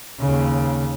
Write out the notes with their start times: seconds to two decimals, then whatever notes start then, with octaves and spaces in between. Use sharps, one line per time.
0.19 D#2 C#3